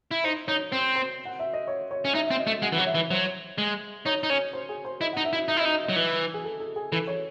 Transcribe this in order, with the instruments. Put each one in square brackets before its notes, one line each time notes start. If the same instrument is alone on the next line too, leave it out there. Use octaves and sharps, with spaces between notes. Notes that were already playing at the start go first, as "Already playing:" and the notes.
[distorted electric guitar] E4
[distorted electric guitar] D#4 [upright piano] C5
[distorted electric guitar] D#4 [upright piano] C#5
[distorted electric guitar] C4 [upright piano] C5
[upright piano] C5
F#5
E5
D#5
C#5
C#5
[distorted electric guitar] C#4
[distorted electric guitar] D#4 [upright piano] E5
[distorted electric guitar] C4 [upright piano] E5
[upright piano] D#5
[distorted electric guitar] A3
[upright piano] E5
[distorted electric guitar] G#3 [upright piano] F#5
[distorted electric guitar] E3
[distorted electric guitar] F#3 [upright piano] F#5
[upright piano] E5
[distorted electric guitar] E3
[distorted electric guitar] F#3 [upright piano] C5
[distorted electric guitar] G#3
[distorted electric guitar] D#4 [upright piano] C#5
[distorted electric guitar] D#4
[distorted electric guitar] C#4 [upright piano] C#5
[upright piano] C5
G#4
C5
[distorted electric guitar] E4 [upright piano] D#5
[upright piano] F#5
[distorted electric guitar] D#4
[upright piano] E5
[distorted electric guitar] E4
[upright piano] E5
[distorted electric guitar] D#4 [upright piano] E5
[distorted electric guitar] E4
[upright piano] D#5
[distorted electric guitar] D#4
[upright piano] D#5
[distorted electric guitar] F#3 [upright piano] D#5
[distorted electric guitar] E3
[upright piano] G#4
A4
A4
G#4
[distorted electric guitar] E3 [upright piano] A4
[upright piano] C#5